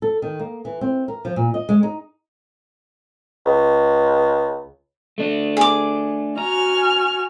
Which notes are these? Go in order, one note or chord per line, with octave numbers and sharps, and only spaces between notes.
A4
D#3
A#3
E3
C4
A#4
F3
A#2
D#5
G#3
D#4
C#2
A3 D4
G#4 D6
F#4 G#5 A#5 F6